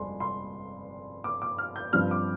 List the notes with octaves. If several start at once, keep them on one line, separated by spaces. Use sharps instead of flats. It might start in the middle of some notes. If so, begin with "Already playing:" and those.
Already playing: G1 F2 G#3 D4 C6
C6
D6
D6
F6
G6
G2 F3 C4 F6
D6